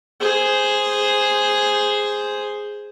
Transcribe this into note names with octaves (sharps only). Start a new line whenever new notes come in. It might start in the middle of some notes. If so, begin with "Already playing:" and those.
G#4 C5